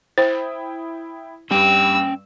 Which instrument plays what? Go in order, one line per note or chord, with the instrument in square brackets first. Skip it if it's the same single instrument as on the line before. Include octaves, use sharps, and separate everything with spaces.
[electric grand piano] E4 G5 D#6 [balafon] C5
[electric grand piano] G2 G3 [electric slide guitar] C#4 G5 [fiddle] E6